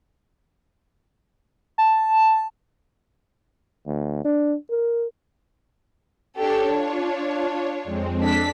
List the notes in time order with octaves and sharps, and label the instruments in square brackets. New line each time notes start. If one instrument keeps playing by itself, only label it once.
[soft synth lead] A5
[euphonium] D2
D4
A#4
[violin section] D4 G4 A4 [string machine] C#5
[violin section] D4 [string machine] F4 C#5
[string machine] F2 G#3 C4
[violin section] D4 A4 B6